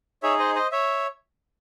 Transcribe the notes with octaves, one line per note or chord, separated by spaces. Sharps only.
D#4 G#4 C#5 E5
C5 D#5
C5 D#5
C#5 E5